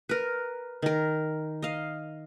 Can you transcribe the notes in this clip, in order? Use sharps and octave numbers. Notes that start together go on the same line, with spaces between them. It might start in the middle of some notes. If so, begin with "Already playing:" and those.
A#4 B4
D#3 A#4
D#5 F5